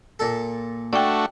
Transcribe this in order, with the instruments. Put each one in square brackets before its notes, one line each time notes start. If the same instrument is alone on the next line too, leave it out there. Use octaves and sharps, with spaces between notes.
[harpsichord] A#2 A4
[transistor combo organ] A3 D4 F#4 [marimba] D5 G5